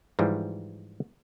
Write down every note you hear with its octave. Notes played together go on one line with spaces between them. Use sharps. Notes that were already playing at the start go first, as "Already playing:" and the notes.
G#2 E3 F3 G3